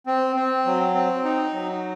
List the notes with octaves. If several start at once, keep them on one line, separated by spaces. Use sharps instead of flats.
C4
C4
F#3
C4
D#4
F#3